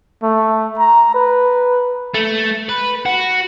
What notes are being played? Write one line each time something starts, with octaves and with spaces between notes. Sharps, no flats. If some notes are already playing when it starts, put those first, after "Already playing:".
A3
A#5
B4
A3
B4
F#4